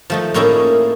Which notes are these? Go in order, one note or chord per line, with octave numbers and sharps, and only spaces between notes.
F3 A3 D#4
A2 A#3 C#4 D#4 E4 G#4